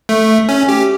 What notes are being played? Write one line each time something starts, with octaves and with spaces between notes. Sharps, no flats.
A3
C#4
G4